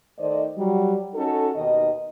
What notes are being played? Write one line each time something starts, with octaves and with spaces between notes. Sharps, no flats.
D#3 A3 C5 D5 D#5
F#3 G3
C#4 D#4 F#4 A4
D#2 B2 D#3 D#5